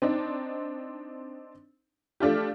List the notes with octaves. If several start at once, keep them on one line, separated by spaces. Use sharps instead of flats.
C4 D4 D#4
A3 D4 F4 G4